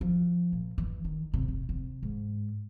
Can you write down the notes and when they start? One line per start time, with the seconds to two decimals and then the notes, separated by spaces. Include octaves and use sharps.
0.01 F3
0.53 A#2
0.78 E3
1.04 D#3
1.33 C3
1.48 C3
1.69 C3
2.03 G#2